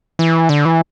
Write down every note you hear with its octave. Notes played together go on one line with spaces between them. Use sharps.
E3
D3
E3